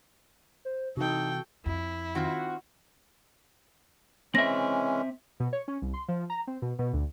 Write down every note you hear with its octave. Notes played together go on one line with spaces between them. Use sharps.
C5
C3 E3 D#4 F#4 A4 G5
F2 E4
D#3 C4 F4 F#4
E3 G#3 C4 C#4 E5 A#6
B2
C#5
C#4
C2
C6
F3
A#5
C4
B2
B2
D2